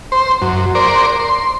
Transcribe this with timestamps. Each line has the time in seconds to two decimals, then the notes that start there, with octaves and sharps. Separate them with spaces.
0.12 C5
0.42 F#2
0.75 A#4 C5 D5
1.20 C6